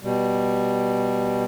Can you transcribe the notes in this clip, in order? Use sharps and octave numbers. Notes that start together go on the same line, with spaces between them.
B2 G3